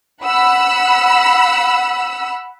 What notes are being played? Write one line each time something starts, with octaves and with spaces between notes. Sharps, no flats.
F#5 B5 E6